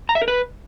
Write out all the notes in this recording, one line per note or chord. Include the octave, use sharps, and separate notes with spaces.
A#5
E5
A#4
B4